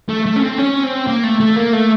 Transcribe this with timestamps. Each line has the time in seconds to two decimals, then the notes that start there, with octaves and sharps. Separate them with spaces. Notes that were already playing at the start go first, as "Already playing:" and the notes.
0.09 A3
0.26 A3
0.36 C#4
0.42 C4
0.58 C#4
0.83 C4
1.07 A#3
1.24 A3
1.40 A3
1.56 A#3
1.73 A3